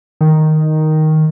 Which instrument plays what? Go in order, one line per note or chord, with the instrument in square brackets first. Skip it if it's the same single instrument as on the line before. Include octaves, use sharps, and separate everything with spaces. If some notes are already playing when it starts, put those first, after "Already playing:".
[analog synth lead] D#3